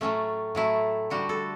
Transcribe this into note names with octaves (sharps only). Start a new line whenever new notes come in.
A2 F#3 A3 C#4
A2 F#3 A3 E4
D3 G3 F#4
A4